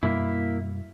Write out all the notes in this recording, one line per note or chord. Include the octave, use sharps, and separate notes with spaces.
F#2 B2 G3 A#3 E4